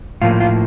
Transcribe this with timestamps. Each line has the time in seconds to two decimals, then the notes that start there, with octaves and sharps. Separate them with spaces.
0.22 A2 F3 A#3 F4
0.40 F4